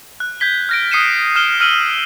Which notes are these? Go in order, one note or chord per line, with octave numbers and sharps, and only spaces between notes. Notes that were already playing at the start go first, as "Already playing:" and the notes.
F#6
G6 G#6 B6 G7
F6 A#6 D7
D#6 C7 C#7 D#7 E7
F6 E7 G7
E6 F6 D#7 F#7 G7